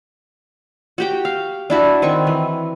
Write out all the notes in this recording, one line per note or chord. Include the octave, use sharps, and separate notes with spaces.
F#4 G4 G5
F5
D4 E4 F#4
D#3 C4 C#6
E3